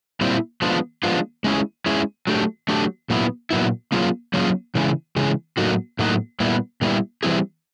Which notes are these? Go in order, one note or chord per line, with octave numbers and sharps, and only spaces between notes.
A#2 G3 C4 E4 G4
F3 G#3 B3 D4 F4
F3 G#3 B3 D4 F4
G#3 C#4 E4 G#4
G#3 C#4 E4 G#4
F#3 A3 D4 G4
F#3 A3 D4 G4
A#2 F#3 B3 E4
A#2 F#3 B3 E4
F#3 A#3 C#4 F4 G#4
F#3 A#3 C#4 F4 G#4
C#3 E3 G#3
C#3 E3 G#3
A2 F#3 A#3 D#4 F#4
A2 F#3 A#3 D#4 F#4
A#2 G3 B3 E4
A#2 G3 B3 E4
E3 G3 C4 E4 G#4